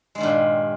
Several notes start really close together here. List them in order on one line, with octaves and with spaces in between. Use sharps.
G#3 D#3 G2 A#2